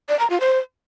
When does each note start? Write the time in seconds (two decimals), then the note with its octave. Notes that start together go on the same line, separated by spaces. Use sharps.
0.09 D5
0.19 A#5
0.30 F4
0.40 C5